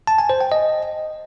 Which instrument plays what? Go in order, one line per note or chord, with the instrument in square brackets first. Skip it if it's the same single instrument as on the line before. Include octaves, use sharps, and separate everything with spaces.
[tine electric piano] A5
G#5
C5
G5
D#5